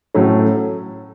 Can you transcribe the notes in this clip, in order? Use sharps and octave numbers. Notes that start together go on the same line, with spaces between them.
A2 F#3 A3 C#4